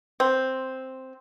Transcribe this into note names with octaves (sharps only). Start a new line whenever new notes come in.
C4